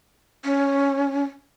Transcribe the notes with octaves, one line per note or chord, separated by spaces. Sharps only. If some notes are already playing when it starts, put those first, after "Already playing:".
C#4